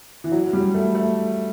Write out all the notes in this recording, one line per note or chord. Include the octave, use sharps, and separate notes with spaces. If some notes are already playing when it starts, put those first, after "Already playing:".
E3
F#3
G3
A3
A3